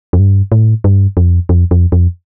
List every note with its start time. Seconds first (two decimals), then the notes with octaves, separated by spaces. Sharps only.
0.13 F2
0.19 G2
0.52 A2
0.84 G2
1.17 F2
1.49 F2
1.71 F2
1.92 F2